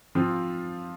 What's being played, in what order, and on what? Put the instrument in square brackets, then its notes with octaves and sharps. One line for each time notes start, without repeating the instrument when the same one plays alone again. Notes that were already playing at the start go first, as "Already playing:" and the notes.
[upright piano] F3 C4 F4